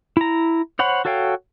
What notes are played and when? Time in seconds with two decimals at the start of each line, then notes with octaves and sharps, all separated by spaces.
0.17 E4 A#5
0.79 C5 C#5 F#5 B5
1.05 F#4 A4 C#5 F5 G5